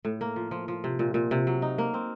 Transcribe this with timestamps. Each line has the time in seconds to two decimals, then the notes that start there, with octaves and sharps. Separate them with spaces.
0.05 A2
0.21 A#3
0.36 F3
0.51 F3
0.68 F3
0.84 C3
0.99 A#2
1.14 A#2
1.31 C3
1.47 F#3
1.62 D#4
1.78 A#3
1.94 C4